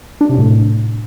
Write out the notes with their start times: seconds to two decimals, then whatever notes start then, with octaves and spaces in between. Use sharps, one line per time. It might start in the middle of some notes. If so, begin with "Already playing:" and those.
0.21 D4
0.29 C3
0.38 A2